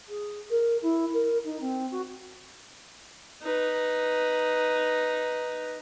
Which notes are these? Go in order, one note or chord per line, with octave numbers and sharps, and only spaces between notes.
G#4
A#4
E4
A#4
D#4
C4
F#4
D#4 B4